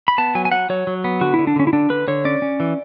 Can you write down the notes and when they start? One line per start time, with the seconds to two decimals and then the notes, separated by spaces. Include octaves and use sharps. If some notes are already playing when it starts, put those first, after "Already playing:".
0.08 B5
0.18 B3 A5
0.35 F#3 G#5
0.45 G#5
0.52 F#3 F#5
0.69 F#3 C#5
0.87 F#3
1.04 B3
1.21 D3 F#4
1.34 D3 E4
1.47 D4
1.56 D3 C#4
1.67 E4
1.73 D3 D4
1.90 D3 B4
2.08 D3 C#5
2.25 C#4 D5
2.42 C#4
2.60 E3